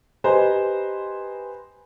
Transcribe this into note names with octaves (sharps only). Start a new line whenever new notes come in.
G4 B4 C5 D#5 G#5 A#5